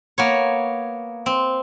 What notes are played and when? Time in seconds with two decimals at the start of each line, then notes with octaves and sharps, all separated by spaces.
0.18 A#3 B3 C#5
1.26 C4